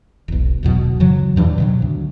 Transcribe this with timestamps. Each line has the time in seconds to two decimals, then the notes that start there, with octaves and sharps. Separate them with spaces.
0.28 E1 B1
0.63 D1 E2 B2 F#3
1.00 F#2 C#3 E3 F#3
1.36 E2 G2 E3
1.58 B2 D#3 F#3
1.82 D2